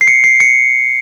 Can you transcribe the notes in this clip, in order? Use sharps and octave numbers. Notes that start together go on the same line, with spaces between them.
C7
C#7
C7
C#7